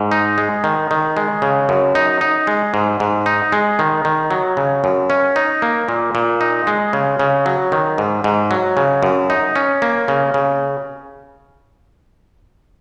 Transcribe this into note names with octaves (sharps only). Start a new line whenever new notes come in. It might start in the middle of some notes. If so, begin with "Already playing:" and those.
Already playing: G#2
D#4
G#3
D#3
D#3
G#3
C#3
F#2
D#4
D#4
G#3
G#2
G#2
D#4
G#3
D#3
D#3
F#3
C#3
F#2
C#4
D#4
A#3
A#2
A#2
D#4
G#3
C#3
C#3
F#3
D#3
G#2
G#2
F#3
C#3
F#2
D#4
C#4
A#3
C#3
C#3